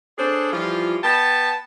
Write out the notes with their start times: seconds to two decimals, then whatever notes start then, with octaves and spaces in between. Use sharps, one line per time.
0.19 D4 G#4 A4 C5 C#5
0.53 E3 F3 G3 F4
1.04 B3 G5 A5